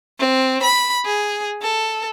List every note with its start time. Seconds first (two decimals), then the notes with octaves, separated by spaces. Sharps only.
0.19 C4
0.63 B5
1.06 G#4
1.62 A4